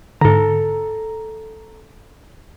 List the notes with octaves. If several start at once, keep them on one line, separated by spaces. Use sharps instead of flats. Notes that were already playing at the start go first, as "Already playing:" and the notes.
G#2 D3 A4 A#5